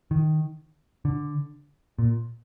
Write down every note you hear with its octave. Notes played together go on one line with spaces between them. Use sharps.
D#3
D3
A#2